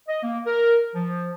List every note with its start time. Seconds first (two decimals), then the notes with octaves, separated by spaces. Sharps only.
0.08 D#5
0.23 A#3
0.46 A#4
0.95 F3